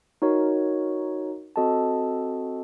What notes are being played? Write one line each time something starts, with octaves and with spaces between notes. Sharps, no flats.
D#4 F#4 A#4 C#5
C4 F#4 A4 D#5 A5